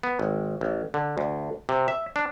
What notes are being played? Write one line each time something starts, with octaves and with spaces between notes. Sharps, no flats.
B3
G#1
A1
D3
D2
C3
E5
D4